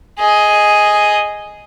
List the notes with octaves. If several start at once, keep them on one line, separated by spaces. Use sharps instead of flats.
G#4 D#5